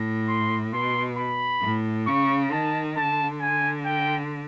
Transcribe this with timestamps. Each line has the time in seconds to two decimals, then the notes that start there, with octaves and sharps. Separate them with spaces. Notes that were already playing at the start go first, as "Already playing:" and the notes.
Already playing: A2
0.28 C6
0.73 B2 C6
1.18 B5
1.62 A2
2.07 C#3 C#6
2.52 D#3 A5
2.97 D3 A5
3.41 G#5
3.85 G5